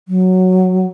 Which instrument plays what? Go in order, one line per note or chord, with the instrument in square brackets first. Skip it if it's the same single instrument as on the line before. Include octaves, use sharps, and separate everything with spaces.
[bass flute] F#3